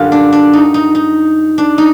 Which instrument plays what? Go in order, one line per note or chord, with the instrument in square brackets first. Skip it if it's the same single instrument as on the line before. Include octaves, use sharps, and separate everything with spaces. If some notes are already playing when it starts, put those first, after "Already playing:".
Already playing: [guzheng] F#2 D3 G3 F4
D4
D4
D#4
D#4
D#4
D4
D#4